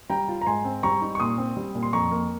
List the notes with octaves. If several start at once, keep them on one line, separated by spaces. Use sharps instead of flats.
G3 G5 A#5
F4
A#5
G#2 G#5 C6
C4
G3 A#5 C#6
D#4
C#6
A#2 C6 D#6
C4
G3
A#2
C6
F2 A#5 C#6
A#3